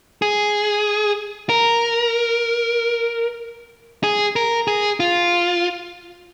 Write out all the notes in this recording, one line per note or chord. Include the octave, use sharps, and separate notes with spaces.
G#4
A#4
G#4
A#4
G#4
F4